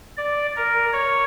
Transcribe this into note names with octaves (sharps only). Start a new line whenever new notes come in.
D5
A#4
C#5